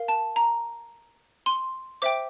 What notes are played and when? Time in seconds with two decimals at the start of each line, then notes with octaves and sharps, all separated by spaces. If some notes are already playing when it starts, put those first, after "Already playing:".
Already playing: A#4 F5
0.08 A5
0.36 A#5
1.46 C6
2.02 C5 E5 G5 D6